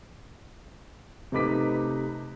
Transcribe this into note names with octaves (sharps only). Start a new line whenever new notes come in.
C3 A3 D#4 B4 D6 B6